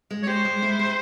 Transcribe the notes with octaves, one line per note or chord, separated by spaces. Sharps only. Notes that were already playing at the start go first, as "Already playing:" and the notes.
G#3
C#5
G4 C5
G#3
E4
G4